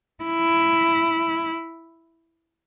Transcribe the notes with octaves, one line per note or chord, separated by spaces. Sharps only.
E4